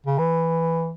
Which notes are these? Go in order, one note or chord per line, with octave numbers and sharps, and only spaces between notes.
C#3
E3